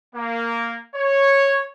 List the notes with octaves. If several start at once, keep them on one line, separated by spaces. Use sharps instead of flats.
A#3
C#5